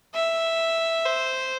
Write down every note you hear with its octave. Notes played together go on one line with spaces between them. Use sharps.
E5
C5